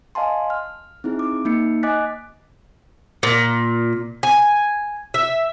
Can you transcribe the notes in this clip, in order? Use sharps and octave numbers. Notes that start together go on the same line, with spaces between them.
D#5 F5 G#5 A5 C6
F6
C4 D#4 E4 G#4
D6
A#3 D#4 C#7
D#5 G#5 D6 F#6 A6 B6
A#2
G#5
E5